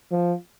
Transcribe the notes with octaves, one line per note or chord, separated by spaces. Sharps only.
F3